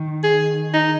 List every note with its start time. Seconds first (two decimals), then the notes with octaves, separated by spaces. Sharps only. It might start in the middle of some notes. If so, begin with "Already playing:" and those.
Already playing: D#3
0.24 G#4
0.74 D#4